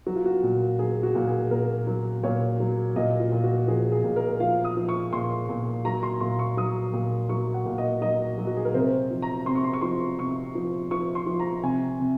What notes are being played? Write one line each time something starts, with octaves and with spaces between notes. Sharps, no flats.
F#3 F#4
F4
F#4
A#2
F#3 G#4
F#4
A#2
G#4
A#2 A#4
F#3
A#2 C#5
F#3
A#2 D#5
F4
A#2
F#4
F3 G#4
G#4
A#2
A#4
F3 F5
D#6
F3
C#6
A#2 C6
A#2
F#3 A#5
C6
A#2 C6
C#6
F#3 D#6
A#2
F#3 C#6
F#5
A#2
D#5
F#3 D#5
F#3
F#4
G#4
A#4
C3 C5
F3
A#5
C3 C6
C#6
C6
C#6
F3 C6
C3 C#6
F3
F3 C#6
C6
F3
A#5
C3 G#5
C3